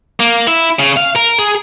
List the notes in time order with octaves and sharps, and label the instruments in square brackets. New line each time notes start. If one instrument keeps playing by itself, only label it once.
[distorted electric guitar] A#3
E4
C#3
F5
A#4
G#4